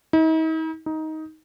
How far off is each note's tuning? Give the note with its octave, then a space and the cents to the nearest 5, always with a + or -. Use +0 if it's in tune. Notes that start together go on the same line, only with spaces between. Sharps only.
D#4 +45
D#4 +15